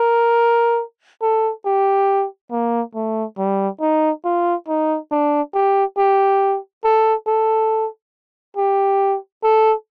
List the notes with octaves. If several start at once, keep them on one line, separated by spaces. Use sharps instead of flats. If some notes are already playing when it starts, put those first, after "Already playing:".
Already playing: A#4
A4
G4
A#3
A3
G3
D#4
F4
D#4
D4
G4
G4
A4
A4
G4
A4